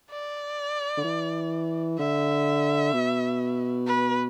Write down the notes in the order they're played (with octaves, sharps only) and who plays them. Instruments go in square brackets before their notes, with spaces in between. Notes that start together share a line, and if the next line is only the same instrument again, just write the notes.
[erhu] D5
[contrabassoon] D3
E3
[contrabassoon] D3 [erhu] E5
[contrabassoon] B2
[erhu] B4